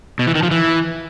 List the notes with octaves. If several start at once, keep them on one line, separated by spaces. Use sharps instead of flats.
B2
E3
D#3
F3
E3